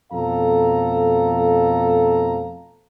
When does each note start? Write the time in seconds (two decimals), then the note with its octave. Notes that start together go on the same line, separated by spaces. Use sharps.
0.12 F2 B2 A3 A4 F5 A#5